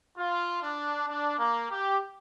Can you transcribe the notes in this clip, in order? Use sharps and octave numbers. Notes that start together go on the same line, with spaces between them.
F4
D4
D4
A#3
G4